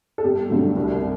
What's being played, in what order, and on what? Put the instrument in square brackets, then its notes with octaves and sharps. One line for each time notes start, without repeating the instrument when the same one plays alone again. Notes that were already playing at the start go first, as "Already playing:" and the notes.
[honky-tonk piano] A4
G1 G4
G2 D3 F#3 A3
C2